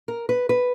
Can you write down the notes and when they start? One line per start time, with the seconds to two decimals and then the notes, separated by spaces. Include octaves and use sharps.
0.08 A#4
0.29 B4
0.49 B4